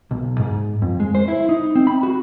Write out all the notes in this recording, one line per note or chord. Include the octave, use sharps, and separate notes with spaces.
B1
G#2
F2
G#3
C5
E4
D#4
C4
B5
F#4